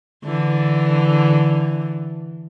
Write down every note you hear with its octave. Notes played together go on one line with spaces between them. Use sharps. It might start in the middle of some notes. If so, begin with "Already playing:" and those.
D3 E3